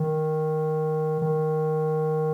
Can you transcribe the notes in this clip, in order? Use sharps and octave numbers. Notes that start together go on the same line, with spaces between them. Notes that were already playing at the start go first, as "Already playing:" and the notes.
Already playing: D#3
D#3